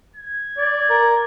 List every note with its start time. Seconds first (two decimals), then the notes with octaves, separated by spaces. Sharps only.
0.16 G#6
0.58 D5
0.90 A#4